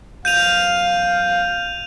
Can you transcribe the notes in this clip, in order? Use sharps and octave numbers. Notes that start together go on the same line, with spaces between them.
F#2 B2 F5 G6 D#7 F7